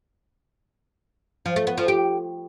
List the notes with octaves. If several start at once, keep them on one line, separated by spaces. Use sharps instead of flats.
F3
A3
B3
F3
G4